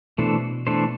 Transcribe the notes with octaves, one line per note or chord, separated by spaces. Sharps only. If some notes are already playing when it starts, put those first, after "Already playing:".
B2 E3 A3 D4 A4 C5
E3 A3 D4 A4 C5